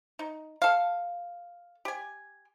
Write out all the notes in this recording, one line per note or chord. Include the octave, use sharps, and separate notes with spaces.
D#4
A4 F5
G4 G#5